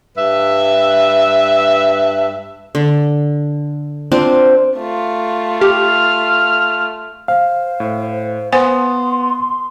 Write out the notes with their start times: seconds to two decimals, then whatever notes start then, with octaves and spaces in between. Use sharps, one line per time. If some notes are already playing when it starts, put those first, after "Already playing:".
0.18 G2 B4 E5
2.75 D3
4.12 C4 D4 F4 C5
4.77 A3 F4
5.61 G4 F6
7.28 C5 F5
7.80 A2
8.53 B3 C5 F#5 G#5 C6 D#6